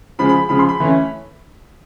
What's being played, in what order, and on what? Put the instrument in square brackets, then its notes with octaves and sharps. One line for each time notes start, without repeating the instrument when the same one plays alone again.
[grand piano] C#3 F3 G#3 [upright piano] B5
[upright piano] B5
[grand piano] C#3 F3 G#3 [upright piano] B5
[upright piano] C6
B5
[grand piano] E3 A3 C#4